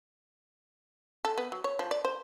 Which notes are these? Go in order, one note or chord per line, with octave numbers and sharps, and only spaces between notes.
A4
B3
F#3
C#5
F3
D5
C5